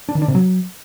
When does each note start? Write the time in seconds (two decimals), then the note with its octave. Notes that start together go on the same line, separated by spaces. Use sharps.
0.09 D4
0.15 D#3
0.22 D4
0.28 C3
0.35 F#3